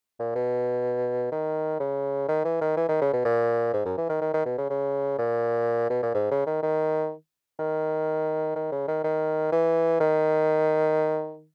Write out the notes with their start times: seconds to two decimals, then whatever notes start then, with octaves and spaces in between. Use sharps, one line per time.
0.20 A#2
0.35 B2
1.32 D#3
1.80 C#3
2.28 D#3
2.44 E3
2.61 D#3
2.77 E3
2.89 D#3
3.01 C#3
3.13 B2
3.25 A#2
3.73 G#2
3.85 F#2
3.97 E3
4.09 D#3
4.21 D#3
4.33 D#3
4.45 B2
4.58 C#3
4.70 C#3
5.18 A#2
5.90 B2
6.03 A#2
6.14 G#2
6.31 C#3
6.46 D#3
6.63 D#3
7.59 D#3
8.56 D#3
8.72 C#3
8.88 D#3
9.04 D#3
9.52 E3
10.00 D#3